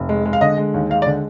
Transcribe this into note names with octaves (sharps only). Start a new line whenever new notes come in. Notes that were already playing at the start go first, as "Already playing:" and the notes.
Already playing: F1
G#3
G#3
F5
D3 D#5
G#3
D#2
G#3 F5
D5
D3